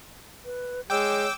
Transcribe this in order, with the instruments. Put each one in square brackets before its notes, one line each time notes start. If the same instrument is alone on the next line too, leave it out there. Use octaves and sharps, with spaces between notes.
[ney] B4
[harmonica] G#3 [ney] C#5 [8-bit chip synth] G5 D6 E6